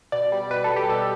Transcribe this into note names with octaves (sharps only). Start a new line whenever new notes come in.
B2 D5
G3
B2 B4
A4
G3
G4
B2 A4